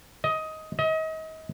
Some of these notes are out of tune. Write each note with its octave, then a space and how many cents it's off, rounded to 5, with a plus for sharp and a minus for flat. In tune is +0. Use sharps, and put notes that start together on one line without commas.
D#5 +15
D#5 +35